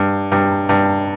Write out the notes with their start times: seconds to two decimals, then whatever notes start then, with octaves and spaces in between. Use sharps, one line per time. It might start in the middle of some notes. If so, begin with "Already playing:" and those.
Already playing: G2
0.32 G2
0.69 G2